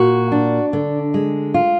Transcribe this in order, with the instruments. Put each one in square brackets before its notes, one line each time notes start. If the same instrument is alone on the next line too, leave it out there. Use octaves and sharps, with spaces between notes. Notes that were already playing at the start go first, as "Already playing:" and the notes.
Already playing: [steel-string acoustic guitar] A#2 F#4
D4
D3
G#3
F4